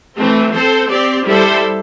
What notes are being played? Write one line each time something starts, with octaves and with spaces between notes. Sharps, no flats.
E3 A3 C4
C4 A4 C5
C4 G4 D5
G3 E4 A4 C5